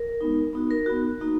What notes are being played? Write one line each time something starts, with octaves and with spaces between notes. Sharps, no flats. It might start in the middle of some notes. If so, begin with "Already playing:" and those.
Already playing: A#4
G#3 B3 D#4
B3 D#4 F#4
A#4
B3 D#4 F#4
A#3 D#4 F#4